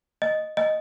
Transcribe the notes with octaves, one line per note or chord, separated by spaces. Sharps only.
D#5
D#5